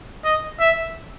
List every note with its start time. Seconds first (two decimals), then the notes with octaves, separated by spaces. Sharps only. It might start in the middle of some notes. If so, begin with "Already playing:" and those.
0.24 D#5
0.60 E5